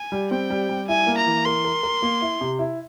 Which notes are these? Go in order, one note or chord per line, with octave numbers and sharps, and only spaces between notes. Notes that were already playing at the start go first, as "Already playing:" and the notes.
Already playing: G#5
G3
C4 G5
G3
G3
E4 G#5
A#3
A#5
E3
A#4 C6
A#4
A#4
A#3
E4
C3
E4